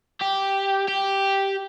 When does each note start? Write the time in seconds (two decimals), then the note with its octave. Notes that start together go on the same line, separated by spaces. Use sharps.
0.21 G4
0.88 G4